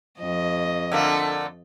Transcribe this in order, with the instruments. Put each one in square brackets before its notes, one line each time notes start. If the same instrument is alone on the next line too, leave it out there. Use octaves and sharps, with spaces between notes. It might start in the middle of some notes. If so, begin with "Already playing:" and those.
[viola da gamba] F2 D#5
[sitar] D3 A3 A#3